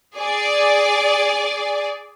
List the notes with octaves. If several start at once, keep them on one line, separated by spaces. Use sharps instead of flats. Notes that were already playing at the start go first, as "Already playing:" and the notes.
G#4 D5